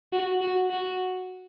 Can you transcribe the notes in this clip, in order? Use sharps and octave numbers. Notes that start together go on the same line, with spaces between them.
F#4
F#4
F#4